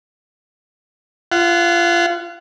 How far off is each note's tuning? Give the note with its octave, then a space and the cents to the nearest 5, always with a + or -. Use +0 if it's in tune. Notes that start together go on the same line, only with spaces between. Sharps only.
F4 -25 F#5 +0